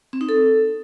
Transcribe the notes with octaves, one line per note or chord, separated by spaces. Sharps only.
C4
D#4
A4